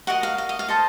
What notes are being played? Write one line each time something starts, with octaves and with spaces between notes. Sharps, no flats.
F#4 A#4 D#5 F#5
F5
F5
D#5
F5
A4 C5 D#5 A5